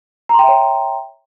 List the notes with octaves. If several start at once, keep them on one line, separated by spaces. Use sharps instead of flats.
C#5 E5 G5 A#5 C6